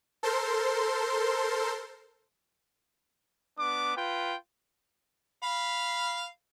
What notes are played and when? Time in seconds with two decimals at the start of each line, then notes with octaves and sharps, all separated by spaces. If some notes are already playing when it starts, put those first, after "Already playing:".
0.23 A4 A#4 C5 C6
3.58 B3 D4 D6
3.97 F4 B4 G5
5.43 F5 B5